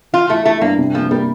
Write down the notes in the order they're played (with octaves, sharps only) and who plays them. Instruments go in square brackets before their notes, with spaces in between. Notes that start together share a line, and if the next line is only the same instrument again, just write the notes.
[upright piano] E3 [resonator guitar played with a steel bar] F4
[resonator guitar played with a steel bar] A3 [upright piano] E4
[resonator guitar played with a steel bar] A3 [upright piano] E4
[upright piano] G2 [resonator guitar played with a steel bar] A#3
[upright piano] C3
[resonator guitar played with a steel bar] F3 [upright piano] A#3
[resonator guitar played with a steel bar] G3 [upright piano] A#3